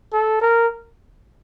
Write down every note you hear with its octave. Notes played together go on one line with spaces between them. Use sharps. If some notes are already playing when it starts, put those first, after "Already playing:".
A4
A#4